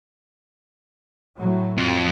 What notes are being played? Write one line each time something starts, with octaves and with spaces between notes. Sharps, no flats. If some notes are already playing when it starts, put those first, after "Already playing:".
A2 F#3
F2